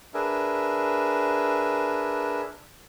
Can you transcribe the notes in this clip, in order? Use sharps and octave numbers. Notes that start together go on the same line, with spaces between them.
D4 G#4 A#4 B4 E5